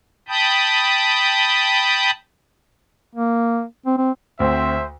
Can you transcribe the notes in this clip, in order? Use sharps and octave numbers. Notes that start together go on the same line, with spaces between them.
G5 A5 B5 D#6 G6
A#3
C4
C4
D2 C4 C5 E5